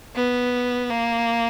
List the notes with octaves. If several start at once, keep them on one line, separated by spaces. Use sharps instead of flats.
B3
A#3